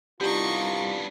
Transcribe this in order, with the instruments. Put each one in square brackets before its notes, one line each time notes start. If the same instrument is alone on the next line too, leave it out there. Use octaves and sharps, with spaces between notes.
[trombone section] C2 G3 F4 [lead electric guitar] B3 D4 [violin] D#4 C#6 [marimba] G4